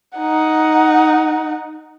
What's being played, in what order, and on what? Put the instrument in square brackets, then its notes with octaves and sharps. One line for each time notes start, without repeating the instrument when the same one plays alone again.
[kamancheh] D#4 F#5